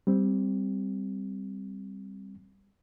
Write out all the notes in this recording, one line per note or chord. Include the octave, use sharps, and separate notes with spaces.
G3 C4